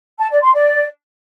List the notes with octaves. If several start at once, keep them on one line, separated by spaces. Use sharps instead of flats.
A5
D5
C6
D5